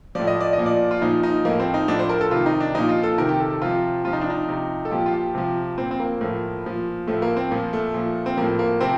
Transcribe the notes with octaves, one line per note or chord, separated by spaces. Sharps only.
A2 F3 D5
D#5
D5
D#5
A#2 F3
D5
F4
A#2 F3 D#4
D#4
A2 F3 A#3
C4
D#4
A2 F3 D4
C5
A#4
A4
C3 D#3 F4
D#4
D4
A#2 F3 D#4
F4
A4
C3 D#3 A#4
G4
A4
A4
C3 F3 F4
C3 F3 F4
D#4
D4
D#4
C3 F3
A4
A#2 F3 G4
F4
G4
C3 F3
A#2 F3 C4
C4
A#3
A2 F3
A#2 F3
A2 F3 A3
A#3
C4
A#2 F3 A#3
A3
A#2 F3
C4
A2 F3 A#3
A#3
C3 F3 C4